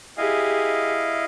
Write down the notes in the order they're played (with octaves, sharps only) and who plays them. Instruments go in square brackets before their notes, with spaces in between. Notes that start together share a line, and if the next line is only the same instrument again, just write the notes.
[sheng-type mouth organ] E4 D#5 F5 [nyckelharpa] G4 G#4